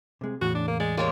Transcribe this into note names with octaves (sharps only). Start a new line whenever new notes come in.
C3 G#3
E2 A2 C#3 F#4
D4
A#3
G#3 D5
G#3 A#3 G4 C#5